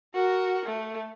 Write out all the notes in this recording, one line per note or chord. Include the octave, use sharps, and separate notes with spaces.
F#4 A#4
A3